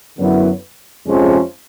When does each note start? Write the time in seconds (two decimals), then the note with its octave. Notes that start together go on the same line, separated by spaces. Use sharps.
0.18 F#2 D3 F#3 B3 E4
1.07 F2 C3 F3 G#3 C#4